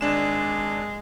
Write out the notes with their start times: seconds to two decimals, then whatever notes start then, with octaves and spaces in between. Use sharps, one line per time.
0.01 G#1 G#3 D4 E7